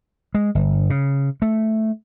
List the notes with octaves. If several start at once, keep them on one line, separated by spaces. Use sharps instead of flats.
G#3
G1
C#3
A3